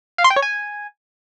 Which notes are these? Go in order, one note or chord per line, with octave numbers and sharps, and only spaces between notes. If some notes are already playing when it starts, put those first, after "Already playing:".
F5
C6
G5
C#5
G#5